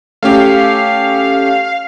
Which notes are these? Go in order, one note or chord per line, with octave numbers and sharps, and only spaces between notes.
A3 C#4 G4 F5